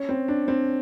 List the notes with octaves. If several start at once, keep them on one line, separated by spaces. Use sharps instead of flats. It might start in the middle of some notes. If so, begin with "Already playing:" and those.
Already playing: C#4
C4
D4
C4